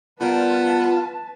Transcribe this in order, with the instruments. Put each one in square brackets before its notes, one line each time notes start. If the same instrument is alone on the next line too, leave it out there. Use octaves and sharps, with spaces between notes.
[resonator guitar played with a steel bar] G3 A#4 [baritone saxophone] B3 [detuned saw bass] F4 [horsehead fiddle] B4 A5